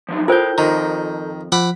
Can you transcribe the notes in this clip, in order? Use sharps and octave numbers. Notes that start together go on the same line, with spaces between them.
F3 F#3 D#4
E4 F4 A4 A#4 C5 G5 G6
F2 D#3 A#5
F3 F#5 B5 D6